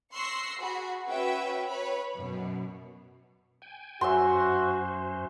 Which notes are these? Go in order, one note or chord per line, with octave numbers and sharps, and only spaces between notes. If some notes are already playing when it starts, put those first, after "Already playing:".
C6 C#6 E6 F#6 A#6 C7
F#4 G#4 B5
C#4 F#4 B4 C#5 E5 G5
B4 C#5 B5
F#2 B2
G5 G#5
F#2 F#4 C5 E5 G#5 C6